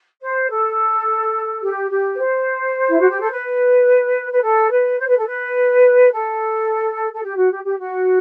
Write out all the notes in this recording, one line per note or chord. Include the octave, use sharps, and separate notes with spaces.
C5
A4
G4
G4
B4
C5
E4
F#4
G4
A4
B4
B4
A4
B4
C5
B4
A4
B4
A4
A4
G4
F#4
G4
G4
F#4